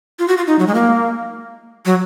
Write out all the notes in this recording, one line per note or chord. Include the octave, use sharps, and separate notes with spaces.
F4
F#4
F4
D#4
F#3
G#3
A#3
F#3